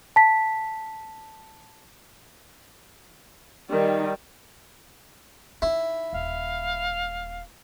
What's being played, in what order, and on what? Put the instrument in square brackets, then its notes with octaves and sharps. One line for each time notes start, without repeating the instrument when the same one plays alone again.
[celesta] A5 B6
[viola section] D#3 [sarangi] G3
[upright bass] D#4 [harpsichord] E4
[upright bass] D#1 [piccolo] F5